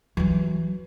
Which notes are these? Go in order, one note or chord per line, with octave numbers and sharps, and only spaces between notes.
E3 F#3